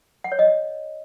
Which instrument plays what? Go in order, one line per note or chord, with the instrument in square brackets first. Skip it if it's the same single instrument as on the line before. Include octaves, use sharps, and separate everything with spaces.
[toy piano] F#5
C#5
D#5